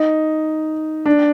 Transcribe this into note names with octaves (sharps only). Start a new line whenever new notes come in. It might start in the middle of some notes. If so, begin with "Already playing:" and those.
Already playing: D#4
D4